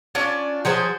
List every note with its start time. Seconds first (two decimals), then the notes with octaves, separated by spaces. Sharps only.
0.15 C#4 D4 F4 D5
0.65 F3 F#3 G#4 C5